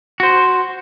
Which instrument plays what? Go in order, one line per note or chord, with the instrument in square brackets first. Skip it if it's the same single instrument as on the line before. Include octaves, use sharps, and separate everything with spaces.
[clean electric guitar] F#4 C5